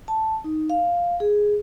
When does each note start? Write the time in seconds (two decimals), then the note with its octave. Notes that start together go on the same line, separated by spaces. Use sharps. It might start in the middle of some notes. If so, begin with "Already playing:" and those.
0.08 A5
0.44 D#4
0.70 F5
1.20 G#4